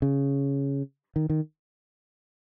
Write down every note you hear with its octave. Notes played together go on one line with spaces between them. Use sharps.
C#3
D#3
D#3